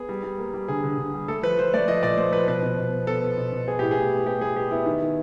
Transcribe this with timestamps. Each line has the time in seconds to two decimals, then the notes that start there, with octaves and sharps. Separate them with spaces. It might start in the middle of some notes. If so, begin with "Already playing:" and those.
Already playing: B3 G#4
0.09 G3
0.23 G3
0.38 A#3
0.54 G3
0.68 D3 G#4
0.84 D3
0.98 D3
1.14 G3
1.28 A3 A4
1.43 F3 B4
1.58 F3 C5
1.74 A3 D5
1.88 F3 D#5
2.03 A#2 D5
2.17 A3 C5
2.32 F3 B4
2.48 B2 B4
2.63 B2
2.78 B2
2.92 B3
3.07 B3 A4
3.22 B3
3.37 B2
3.52 B2
3.67 B3 G#4
3.79 A2 G4
3.91 G#4
3.97 A2
4.12 B3
4.26 B3 G4
4.41 B3 G#4
4.56 B3 G4
4.71 B3 E4
4.86 D#3
5.02 D#3